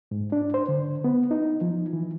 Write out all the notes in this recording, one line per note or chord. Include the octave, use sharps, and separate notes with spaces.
G#2
D4
C5
D3
B3
D#4
F3
E3